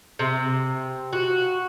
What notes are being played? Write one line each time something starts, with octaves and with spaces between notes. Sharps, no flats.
C3
F#4